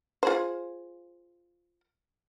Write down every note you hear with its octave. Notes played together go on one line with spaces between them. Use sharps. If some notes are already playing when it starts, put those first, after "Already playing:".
F4 G#4 C5